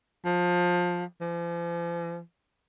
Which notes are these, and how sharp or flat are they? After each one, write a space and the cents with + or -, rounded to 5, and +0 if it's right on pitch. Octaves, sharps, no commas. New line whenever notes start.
F3 +20
F3 -40